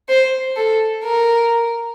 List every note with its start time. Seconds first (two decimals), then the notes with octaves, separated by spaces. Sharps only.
0.09 C5
0.57 A4
1.04 A#4